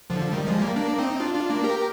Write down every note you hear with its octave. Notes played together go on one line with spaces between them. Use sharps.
D3 F3
D#3 G3
F3 G#3
G3 A#3
A#3 D4
C4 D#4
D4 F4
D4 F4
A#3 D4
G4 A#4